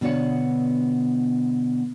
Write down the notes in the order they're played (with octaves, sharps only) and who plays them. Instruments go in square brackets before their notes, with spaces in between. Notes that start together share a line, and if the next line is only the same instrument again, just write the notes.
[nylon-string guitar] B2 D3 B3 D4 C#5 F#5